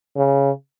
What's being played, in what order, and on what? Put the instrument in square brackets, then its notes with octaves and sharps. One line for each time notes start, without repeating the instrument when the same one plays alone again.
[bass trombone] C#3